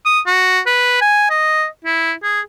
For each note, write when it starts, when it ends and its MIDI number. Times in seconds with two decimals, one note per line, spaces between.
0.05 0.20 87
0.27 0.60 66
0.66 0.99 71
1.01 1.29 80
1.30 1.66 75
1.85 2.13 64
2.23 2.40 68